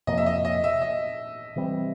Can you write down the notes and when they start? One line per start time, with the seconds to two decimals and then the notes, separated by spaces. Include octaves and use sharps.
0.07 F2 C3 F3 A#3 D#5
0.18 E5
0.26 D#5
0.45 D#5
0.64 E5
0.81 D#5
1.56 C3 E3 G3 C4